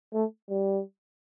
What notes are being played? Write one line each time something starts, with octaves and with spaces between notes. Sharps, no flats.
A3
G3